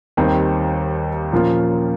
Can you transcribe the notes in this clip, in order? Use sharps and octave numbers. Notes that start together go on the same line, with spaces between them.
D#2 D#3 G3 C4
A#2 F3 A#3 C#4 F4